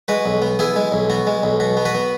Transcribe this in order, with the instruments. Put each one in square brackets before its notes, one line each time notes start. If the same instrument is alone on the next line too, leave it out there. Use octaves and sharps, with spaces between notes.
[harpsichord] G#3 F#4 B4
B1
B3
B3 E4 G#4
G#3
B1
B3 F#4
G#3
B1
B2 F#4
B3
F#4 B4
B3